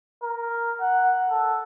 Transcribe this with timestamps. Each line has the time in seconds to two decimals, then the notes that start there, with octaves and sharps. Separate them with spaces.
0.23 A#4
0.80 F#5
1.30 A4